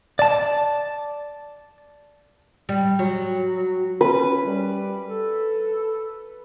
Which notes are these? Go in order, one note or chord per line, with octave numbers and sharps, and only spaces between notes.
D5 A5
G3
F#3
C#4 B4
G3
A4